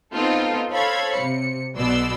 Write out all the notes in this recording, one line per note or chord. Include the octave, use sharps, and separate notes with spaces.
B3 C4 D#4 F4 A4
A4 C5 C#5 F5 B5 G#6
C3 C#7
B1 B2 B3 D5 C6 E6